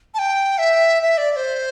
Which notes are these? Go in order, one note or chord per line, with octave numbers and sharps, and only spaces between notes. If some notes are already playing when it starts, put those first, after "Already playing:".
A5
G5
E5
E5
D5
D5
C5